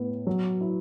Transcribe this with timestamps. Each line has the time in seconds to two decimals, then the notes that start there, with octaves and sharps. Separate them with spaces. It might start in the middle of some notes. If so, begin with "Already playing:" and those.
Already playing: A2 B3
0.27 F#3
0.61 E4